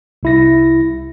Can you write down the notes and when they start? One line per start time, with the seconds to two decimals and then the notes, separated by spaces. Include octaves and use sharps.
0.23 C2 E4 A#6